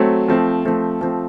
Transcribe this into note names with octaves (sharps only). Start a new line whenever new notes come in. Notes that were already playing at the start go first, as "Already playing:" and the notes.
Already playing: F#3 A3 C4
F3 A3 C4
F3 A3 C4
F3 A3 C4